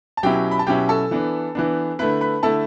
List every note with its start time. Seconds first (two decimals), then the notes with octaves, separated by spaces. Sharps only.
0.17 A5
0.23 B2 F#3 C#4 E4 G4 G5
0.51 B5
0.59 A5
0.67 B2 F#3 C#4 E4 G4 G5
0.89 A4 A5
1.11 E3 B3 D4
1.55 E3 B3 D4
1.99 D3 A3 E4 B4 B5
2.21 B4 B5
2.43 D3 A3 E4 A4 A5